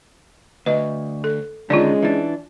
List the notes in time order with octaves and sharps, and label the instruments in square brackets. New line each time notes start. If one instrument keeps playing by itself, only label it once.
[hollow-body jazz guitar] D2 [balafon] B4 D#5
[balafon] A4
[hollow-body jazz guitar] D3 D#3 [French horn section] G#3 C#4 [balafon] F4 D5
[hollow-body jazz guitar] E3 D4